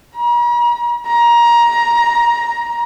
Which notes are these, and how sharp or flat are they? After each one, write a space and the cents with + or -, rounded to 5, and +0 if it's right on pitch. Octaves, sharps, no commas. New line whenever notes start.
A#5 +45
A#5 +20